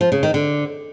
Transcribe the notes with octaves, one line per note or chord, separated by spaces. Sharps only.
F3
C#3
D#3
D3